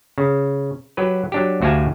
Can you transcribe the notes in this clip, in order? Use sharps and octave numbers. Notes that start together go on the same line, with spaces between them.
C#3
F#3 G4 B4
F#3 D4 G4
D2 F#4 G4 F5 G#5 A5